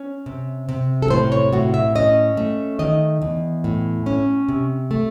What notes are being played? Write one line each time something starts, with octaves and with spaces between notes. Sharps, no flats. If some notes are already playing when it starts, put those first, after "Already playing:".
Already playing: C#4
C3
C3
A4
A2 C5
C#5
A2 F#4
E5
C#4 D#5
A3
D#3 D#5
E2
A2
C#4
C3
A3